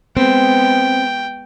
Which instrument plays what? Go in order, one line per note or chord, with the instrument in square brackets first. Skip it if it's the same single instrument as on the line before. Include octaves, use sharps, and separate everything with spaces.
[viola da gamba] G#3 B3 [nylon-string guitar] C4 [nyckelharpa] G5